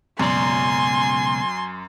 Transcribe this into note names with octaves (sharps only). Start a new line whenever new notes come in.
C#2 F#2 B2 D5 G#5 C6